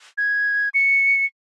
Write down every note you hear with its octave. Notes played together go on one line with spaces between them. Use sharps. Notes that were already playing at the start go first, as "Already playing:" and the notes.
G#6
C#7